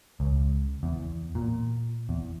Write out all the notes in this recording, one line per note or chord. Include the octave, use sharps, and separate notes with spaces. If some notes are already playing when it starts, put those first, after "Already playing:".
C#2
E2
A#2
E2